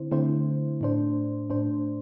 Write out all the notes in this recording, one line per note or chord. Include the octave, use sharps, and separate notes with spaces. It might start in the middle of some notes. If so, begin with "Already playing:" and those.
Already playing: D3 C4 E4 C5
D3 A3 C4 E4 C5
A2 A3 D4 C5
A2 A3 D4 C5